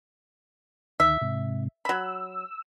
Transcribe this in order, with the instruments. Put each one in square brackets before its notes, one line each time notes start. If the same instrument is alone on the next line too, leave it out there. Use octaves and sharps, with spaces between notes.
[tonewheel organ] D2 D#3 [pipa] E5
[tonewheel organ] G#2 C3
[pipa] F#3 B5 [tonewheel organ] E6